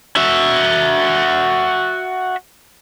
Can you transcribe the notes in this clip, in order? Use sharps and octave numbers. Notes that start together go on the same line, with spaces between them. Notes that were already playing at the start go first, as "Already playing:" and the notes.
F#4 E5